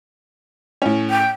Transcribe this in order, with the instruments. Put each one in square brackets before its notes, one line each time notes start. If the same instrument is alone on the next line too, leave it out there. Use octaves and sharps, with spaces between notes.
[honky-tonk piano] A2 C#4
[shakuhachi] G5